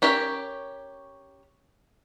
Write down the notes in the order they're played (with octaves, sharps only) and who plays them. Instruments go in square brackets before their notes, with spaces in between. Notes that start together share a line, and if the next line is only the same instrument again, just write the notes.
[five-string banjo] C#4 G4 A#4 C#5 E5